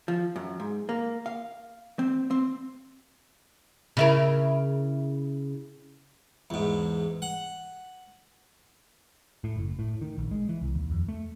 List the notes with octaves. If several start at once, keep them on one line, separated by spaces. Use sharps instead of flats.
F3
F#2
G#2
A#3
F5
C4
C4
C#3 E4 A#4
E2 G#2
F#5
A2
F#1
A2
D#3
A#1
G#3
E3
C2
D#2
F2
A3